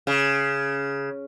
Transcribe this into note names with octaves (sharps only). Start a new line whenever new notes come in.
C#3